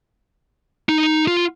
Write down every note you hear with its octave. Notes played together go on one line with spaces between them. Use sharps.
D#4
F4